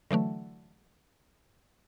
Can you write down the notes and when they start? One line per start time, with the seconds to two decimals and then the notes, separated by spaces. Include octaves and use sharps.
0.11 D3 E3 F#3 A3